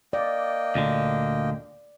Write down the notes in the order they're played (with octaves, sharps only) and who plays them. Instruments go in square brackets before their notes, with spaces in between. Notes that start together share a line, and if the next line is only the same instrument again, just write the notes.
[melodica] A#3 D#5 G5 [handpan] D5
[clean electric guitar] D2 A#2 D3